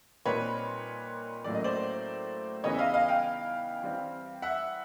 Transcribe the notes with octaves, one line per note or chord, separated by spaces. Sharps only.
A#2 G3 C4 D#4 B4 C#5
A2 F#3 A#3 C#4 D5
D#5
C5 D5
C#3 E3 G3 B3 D#4 C#5 D#5
E5
D#5 F5
D#5 F5
F5 G5
E3 G3 C4
E5 F#5